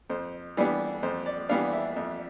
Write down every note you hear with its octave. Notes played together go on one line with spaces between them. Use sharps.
F2 C5
E3 G3 B3 D4
F2 C5
D5
E3 G3 B3 D4 F5
E5
F2 E5